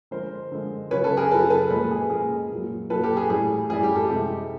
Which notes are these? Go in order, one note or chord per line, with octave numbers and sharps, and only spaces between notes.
D3 F3 G#3 A#4 C5
D3 F3 G#3
C#3 F#3 B4 C#5
A4 B4
G#4 A#4
C#3 F#3 A4 B4
A4 B4
A#2 F3 G#3 A4 B4
G#4
A#2 F3 G#3 G#4 A#4
A#2
F#3
A#2 F#3 A4 B4
G4 A4
G#4
A2 E3 G3 G#4
A2 E3 G3 G#4
G4
G4 A4
C3 F3 G#3 G4 A4